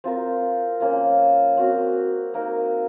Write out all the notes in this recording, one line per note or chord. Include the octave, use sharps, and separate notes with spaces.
C4 F4 A#4
F3 A#3 C#4 F4
C4 F#4 A#4
A#3 D#4 A#4